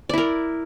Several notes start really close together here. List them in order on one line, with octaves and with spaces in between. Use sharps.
D5 E4 A#4